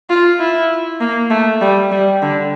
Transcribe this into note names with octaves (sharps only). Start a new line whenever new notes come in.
F4
E4
A#3
A3
G3
G3
D3